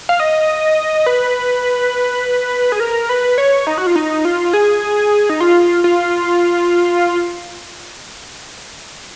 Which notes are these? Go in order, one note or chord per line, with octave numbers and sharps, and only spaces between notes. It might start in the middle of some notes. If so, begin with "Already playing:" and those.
F5
D#5
B4
G#4
A#4
B4
C#5
D#4
F#4
F4
D#4
F4
G#4
D#4
F4
F4